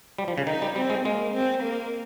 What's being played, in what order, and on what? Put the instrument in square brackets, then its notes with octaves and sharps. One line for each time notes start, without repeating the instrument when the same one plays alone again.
[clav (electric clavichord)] G3
F3
C#3
[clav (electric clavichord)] D#3 [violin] D#4
[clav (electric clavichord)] G3
[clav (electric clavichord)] G3 [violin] C4
[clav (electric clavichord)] G#3
[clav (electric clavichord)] G#3 [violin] A#3
[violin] C4
A#3